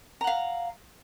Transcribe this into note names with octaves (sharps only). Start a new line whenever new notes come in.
F5 F#5 A#5